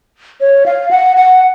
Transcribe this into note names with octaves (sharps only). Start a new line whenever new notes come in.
C#5
F5
F#5
F#5